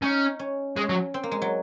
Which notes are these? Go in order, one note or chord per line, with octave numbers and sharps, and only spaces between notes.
C#4 D#4
C#4
G#3 C#4
F#3
C4
A#3
G#3
F#3